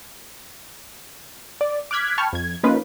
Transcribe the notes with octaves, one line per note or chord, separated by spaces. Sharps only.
D5
D6 F6 F#6 G#6 B6
G5 A5 B5 C#6 F6 G#6
F2 G#6
F3 A#3 C#4 D#4 F4 B4